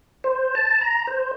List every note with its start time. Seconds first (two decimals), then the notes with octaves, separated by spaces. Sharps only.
0.24 C5
0.55 A5
0.81 A#5
1.07 C5